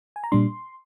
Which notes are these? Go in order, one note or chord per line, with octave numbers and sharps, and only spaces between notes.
G#5
A#5
A#2 G3 D4 C6